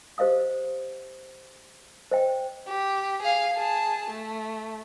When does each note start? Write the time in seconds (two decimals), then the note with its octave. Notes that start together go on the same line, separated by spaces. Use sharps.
0.18 G4 C5 D#5 F5 D#6
2.11 C5 D#5 G5
2.68 G4
3.22 G#4 F5
3.55 G#4 A5
4.11 A3